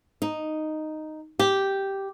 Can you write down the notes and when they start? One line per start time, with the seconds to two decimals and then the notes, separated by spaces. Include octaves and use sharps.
0.22 D#4
1.39 G4